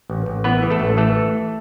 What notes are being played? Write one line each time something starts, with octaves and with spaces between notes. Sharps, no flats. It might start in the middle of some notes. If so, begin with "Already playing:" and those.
A1
A1
E3 B3 B4
E3
A3 A4
A1
E3 A3 A4